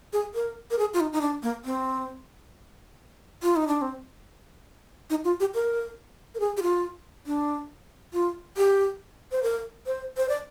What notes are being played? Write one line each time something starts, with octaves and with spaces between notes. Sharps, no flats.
G#4
A#4
A#4
G#4
F4
D#4
D#4
D4
A#3
C4
F4
D#4
D4
C4
D#4
F4
G4
A#4
A#4
G#4
G4
F4
D4
F4
G4
C5
A#4
C5
C5
D5